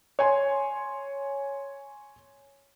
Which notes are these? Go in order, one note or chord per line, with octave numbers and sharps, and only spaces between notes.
C#5 G#5 C6